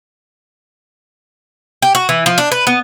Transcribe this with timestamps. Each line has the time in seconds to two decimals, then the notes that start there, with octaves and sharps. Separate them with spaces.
1.82 G4
1.95 F#4
2.09 E3
2.26 F3
2.38 D4
2.52 B4
2.67 B3